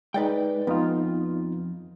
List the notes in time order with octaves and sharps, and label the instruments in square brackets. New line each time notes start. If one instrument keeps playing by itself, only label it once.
[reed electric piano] G#3 D#4 [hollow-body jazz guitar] B4 D5 G5
[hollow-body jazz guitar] F2 [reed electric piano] B3 D#4 F4